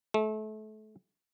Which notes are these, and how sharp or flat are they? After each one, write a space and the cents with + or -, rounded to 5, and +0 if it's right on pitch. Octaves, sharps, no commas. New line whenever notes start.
A3 -30